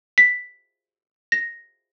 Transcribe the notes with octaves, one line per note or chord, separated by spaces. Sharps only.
B6
A#6